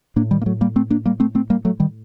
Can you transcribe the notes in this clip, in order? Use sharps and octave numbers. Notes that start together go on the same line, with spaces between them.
A2 A#3 D4
D#3 G3
A#3
F#3 A3
G3 A#3
A3 C4
A#3 D4
G3 A#3
A3 C4
A3 C4
G3 A#3
F#3 A3
D#3 G3